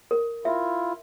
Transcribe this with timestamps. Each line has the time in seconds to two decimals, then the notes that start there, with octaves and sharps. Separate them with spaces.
0.11 A#4
0.45 E4 F4 E5